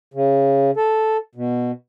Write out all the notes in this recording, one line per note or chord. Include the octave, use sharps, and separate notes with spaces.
C#3
A4
B2